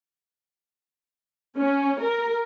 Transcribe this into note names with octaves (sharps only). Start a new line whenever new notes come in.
C#4
A#4